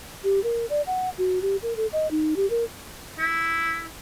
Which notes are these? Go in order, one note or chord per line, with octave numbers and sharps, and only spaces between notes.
G4
A#4
D5
F#5
F#4
G4
A#4
A4
D#5
D#4
G4
A#4
E4